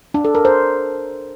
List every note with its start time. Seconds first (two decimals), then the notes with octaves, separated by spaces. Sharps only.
0.14 D4
0.25 A4
0.35 A#4
0.45 C5